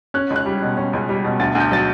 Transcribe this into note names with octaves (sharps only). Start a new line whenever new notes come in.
C#4 F#6
C#2
F#6
G3
B2
C#4
C#2
G3
B2
D2 A6
D2
G6
F#3 A6